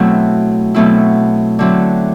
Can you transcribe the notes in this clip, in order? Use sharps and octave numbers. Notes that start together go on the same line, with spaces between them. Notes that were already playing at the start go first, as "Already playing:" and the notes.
Already playing: B2 F#3 A3 C4 E4
B2 F#3 A3 C4 E4
D3 F#3 C4 E4